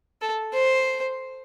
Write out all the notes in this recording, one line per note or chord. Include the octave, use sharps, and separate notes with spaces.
A4
C5